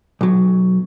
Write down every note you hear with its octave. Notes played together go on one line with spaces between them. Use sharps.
B1 F#3